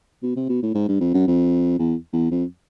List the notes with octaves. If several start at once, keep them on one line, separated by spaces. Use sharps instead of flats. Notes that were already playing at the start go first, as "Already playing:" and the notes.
B2
C3
B2
A2
G#2
G2
F2
F#2
F2
E2
E2
F2